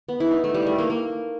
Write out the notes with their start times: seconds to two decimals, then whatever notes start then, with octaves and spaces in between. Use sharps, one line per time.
0.09 B3
0.20 E4
0.31 D#4
0.44 A3
0.54 G3
0.67 A3
0.78 A#3
0.90 A#3